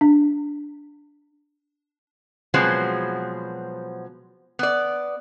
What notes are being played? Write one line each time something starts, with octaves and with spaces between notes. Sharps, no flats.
D4
B2 F3 F#3 G#3 B3 C4
B3 D5